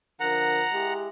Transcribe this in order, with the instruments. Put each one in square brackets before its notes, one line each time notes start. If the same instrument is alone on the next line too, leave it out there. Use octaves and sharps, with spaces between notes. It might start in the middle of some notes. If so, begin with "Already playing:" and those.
[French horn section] D3 F3 A#4 [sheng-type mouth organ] F#5 A#5
[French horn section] G#3 E4 G4